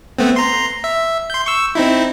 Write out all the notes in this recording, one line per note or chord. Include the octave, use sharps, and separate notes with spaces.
A3 B3 C4
A#5 C6
E5
C6 G6
C#6 E6
C4 D#4 E4